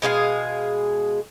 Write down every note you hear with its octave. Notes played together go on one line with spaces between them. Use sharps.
B2 G#3 G#4 F5